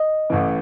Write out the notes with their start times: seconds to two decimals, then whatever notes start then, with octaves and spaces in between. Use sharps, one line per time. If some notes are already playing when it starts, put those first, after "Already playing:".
Already playing: D#5
0.30 A1 A2 E3